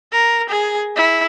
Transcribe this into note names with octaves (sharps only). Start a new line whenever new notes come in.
A#4
G#4
E4